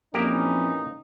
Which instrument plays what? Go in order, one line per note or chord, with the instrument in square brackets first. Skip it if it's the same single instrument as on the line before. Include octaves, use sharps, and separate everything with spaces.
[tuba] F2 [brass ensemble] A#2 E3 C#4 [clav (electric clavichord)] A#3 G4 A#4 [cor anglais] D#4